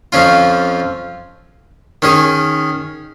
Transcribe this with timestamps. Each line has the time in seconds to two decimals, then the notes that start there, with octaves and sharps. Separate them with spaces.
0.12 F2 F3 C#4 F4
2.02 D#3 C#4 G#4